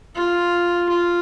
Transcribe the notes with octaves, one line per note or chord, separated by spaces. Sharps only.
F4
F4